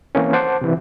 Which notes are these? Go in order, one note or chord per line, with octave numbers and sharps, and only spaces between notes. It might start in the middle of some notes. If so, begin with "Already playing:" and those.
E3 A#3 C4 C#4
C5 F#5 A5 D6
C3 E3